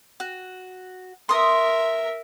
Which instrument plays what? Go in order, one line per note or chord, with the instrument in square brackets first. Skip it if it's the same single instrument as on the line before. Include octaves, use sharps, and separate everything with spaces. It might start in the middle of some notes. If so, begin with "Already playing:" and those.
[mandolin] F#4
[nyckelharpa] A#4 E5 [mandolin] C6 D#6